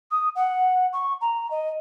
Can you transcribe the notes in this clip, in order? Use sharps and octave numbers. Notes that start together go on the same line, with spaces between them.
D#6
F#5
C#6
A#5
D#5